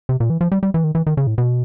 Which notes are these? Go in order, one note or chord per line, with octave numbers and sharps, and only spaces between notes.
C3
A#2
E3
F3
G3
G3
E3
D#3
E3
D#3
C#3
A2
B2